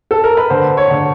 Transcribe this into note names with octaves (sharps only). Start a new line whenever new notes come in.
A4
A#4
B4
D3 C5
C#5
D3